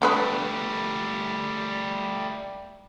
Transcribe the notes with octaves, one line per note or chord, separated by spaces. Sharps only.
D3 G3 A3 B3 B4